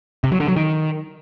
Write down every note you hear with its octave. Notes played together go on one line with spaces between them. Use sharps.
C3
F#3
D3
F#3
D#3